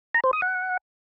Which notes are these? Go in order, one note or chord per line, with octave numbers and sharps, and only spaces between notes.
A#5
C5
D#6
F#5